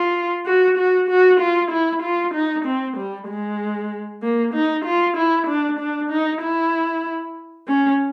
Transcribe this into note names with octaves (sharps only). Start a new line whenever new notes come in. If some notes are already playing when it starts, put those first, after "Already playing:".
Already playing: F4
F#4
F#4
F#4
F4
E4
F4
D#4
C4
G3
G#3
A#3
D#4
F4
E4
D4
D4
D#4
E4
C#4